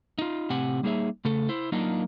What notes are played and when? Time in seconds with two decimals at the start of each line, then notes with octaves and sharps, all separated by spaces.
0.18 D#4 F4
0.50 A2 C3 C4 G4 F#5 G#5
0.83 G3 A#3 D#4 G#4 C#5 E5
1.25 C#3 A3 A4
1.49 E4 C5
1.72 F#3 A#3 D4 D#4 F4